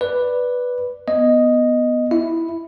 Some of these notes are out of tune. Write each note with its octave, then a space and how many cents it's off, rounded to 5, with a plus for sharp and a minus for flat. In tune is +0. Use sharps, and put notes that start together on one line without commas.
B4 +0 D5 +0
B3 +0 D#5 +0
E4 +0 E5 +0